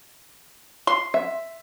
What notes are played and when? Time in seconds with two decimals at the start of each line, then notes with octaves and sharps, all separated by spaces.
0.87 C6
1.14 E5